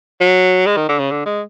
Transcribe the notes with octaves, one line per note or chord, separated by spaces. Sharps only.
F#3
G#3
D#3
D3
C#3
D3
G#3